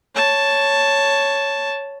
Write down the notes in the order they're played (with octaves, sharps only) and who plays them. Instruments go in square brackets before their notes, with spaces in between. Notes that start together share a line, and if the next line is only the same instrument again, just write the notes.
[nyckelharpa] C#5 A5